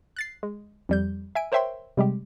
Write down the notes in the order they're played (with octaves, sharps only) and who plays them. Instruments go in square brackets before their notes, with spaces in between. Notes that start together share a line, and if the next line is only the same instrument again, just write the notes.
[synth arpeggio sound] F#6 A6 C7
G#3
F2 G3 G6
E5 G#5 D7
A#4 C5 C#5 E5 G5 C6
C3 G3 G#3 G4